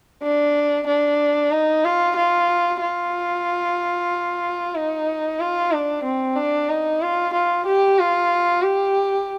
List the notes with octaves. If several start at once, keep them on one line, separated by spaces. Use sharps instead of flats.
D4
D4
D#4
F4
F4
F4
D#4
F4
D4
C4
D4
D#4
F4
F4
G4
F4
G4